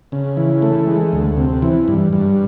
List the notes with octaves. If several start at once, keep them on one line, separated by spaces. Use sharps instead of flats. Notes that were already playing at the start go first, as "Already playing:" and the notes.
C#3
E3
A3
G#3
D2
C3
E3
G2
G2